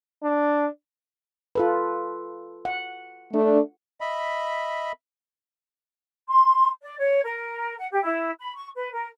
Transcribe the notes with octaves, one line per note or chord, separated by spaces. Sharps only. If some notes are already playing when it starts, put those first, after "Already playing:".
D4
F4 A4 B4
F#5
A3 D4
D#5 E5 B5
C6
D5
C#5
A#4
F#5
G4
E4
B5
C#6
B4
A#4